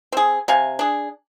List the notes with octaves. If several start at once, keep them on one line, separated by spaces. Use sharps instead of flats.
C4 G#4
C3 F5 G#5
D4 G#4